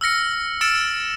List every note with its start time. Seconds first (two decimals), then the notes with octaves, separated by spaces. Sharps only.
0.01 E6 F6 A#6 C#7
0.61 E6 F6 A6 C#7 D7 E7